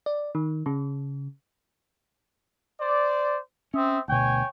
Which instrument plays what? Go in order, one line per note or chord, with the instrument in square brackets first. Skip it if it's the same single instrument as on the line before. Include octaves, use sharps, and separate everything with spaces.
[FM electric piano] D5
D#3
C#3
[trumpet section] C5 D5
[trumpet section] C4 E5 D#6 [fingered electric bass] C#4
[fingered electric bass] D2 B2 [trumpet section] C#5 G5 G#5